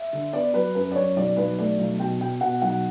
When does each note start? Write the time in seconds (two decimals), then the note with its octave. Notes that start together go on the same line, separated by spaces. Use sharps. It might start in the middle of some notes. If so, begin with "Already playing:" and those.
Already playing: E5
0.13 D3
0.33 B3 D5
0.53 F#3 B4
0.75 F#2 B4
0.91 D5
0.95 F#2 C#5
1.16 B1 D5
1.37 B1 B4
1.58 A3 D5
1.79 B1
1.99 B2 G5
2.20 B2 G5
2.41 B2 F#5
2.62 B1 F#5